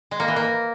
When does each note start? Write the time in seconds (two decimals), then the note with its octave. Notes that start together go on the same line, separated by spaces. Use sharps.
0.11 G#3
0.20 A#3
0.28 E3
0.36 A#3